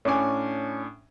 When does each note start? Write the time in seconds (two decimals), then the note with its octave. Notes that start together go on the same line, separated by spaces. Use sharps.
0.05 A2 C#4 D4 G#5 D6